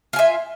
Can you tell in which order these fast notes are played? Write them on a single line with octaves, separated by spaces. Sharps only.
F4 G#5 E5